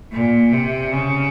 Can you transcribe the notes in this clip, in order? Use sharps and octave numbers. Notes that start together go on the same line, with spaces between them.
A#2
C3
C#3